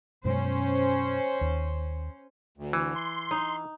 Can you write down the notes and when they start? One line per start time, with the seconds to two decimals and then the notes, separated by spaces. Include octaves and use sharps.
0.25 F#2 B2 G#3 C#4 C5
1.41 D#2
2.58 D2
2.73 E3
2.95 C6
3.31 D#4